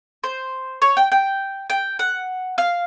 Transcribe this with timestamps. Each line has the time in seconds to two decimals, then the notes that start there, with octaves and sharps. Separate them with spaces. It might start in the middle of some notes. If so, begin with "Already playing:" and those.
0.24 C5
0.82 C#5
0.97 G5
1.12 G5
1.70 G5
1.99 F#5
2.58 F5